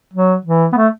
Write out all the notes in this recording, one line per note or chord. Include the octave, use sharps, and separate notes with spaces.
F#3
E3
B3
A3